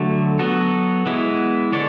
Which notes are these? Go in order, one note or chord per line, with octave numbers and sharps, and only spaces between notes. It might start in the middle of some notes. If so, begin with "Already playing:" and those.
Already playing: D3 F#3 A3
F#3 B3 F#4 A4
E3 G#3 B3 E4
D3 G#3 D4 A4 C#5